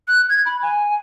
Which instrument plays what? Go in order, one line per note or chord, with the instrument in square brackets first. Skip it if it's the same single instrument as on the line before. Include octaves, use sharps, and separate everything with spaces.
[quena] F#6
G#6
B5
G#5